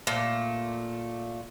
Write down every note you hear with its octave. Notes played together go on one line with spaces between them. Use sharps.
A#2 A3